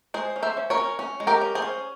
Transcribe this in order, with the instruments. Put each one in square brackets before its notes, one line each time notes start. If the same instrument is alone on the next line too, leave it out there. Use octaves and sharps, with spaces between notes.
[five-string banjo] G#3 G#4 C5
C#4
C5 E5
C#4
A#4 C#5
C#4
C#4
G#3
G4 A#4
C#4
G#4 C5
C#4